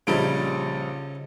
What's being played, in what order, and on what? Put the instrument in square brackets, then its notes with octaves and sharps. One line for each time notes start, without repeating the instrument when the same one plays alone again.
[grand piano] A#1 G3 D7 [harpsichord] C#3 D#4 E4